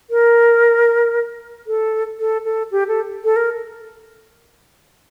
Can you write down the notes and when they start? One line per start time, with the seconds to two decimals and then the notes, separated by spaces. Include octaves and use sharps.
0.10 A#4
1.67 A4
2.20 A4
2.45 A4
2.71 G4
2.88 A4
3.24 A4
3.36 A#4